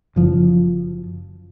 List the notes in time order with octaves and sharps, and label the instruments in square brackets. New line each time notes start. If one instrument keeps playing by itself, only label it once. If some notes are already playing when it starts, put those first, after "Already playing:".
[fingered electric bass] F#1 F3